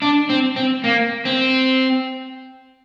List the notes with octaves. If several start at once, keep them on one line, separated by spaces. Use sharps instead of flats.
D4
C4
C4
A#3
C4